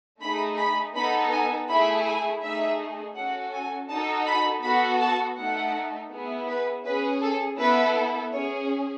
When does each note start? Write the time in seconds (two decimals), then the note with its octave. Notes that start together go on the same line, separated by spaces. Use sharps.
0.21 A3 D#4 G#4 B5
0.57 B5
0.94 B3 D#4 A4 B5
1.31 G#5
1.68 A3 E4 G#4 B5
2.06 G#5
2.42 A3 D#4 G#4 E5
3.16 C#4 F#4 A4 F#5
3.53 G#5
3.89 D#4 F#4 A4 A5
4.26 B5
4.63 B3 F#4 A4 B5
5.00 A5
5.37 A3 D#4 A4 F#5
6.11 B3 E4 G#4
6.48 B4
6.85 C#4 G#4 B4
7.21 A4
7.58 B3 E4 A4 B4
8.32 C#4 G#4 C#5